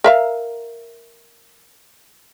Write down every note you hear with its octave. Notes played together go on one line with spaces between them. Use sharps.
A#4 E5 F5